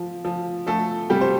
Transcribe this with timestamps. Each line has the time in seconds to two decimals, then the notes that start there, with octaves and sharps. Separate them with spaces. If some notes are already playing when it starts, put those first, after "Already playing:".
Already playing: F3
0.25 F3
0.67 F3 A3 A4
1.10 C3 G3 G4
1.21 C5